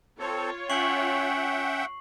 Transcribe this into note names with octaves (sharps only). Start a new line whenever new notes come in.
C4 F4 A4 C#5
C#4 E5 F#5 G5 C#6 C7 F#7